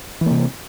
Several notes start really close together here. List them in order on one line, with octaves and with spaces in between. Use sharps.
E3 A#3 C3